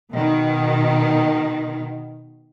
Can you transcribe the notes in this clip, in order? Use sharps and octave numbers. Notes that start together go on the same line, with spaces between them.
B2 D#3